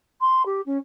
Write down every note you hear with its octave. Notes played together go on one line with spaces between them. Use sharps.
C6
G4
C#4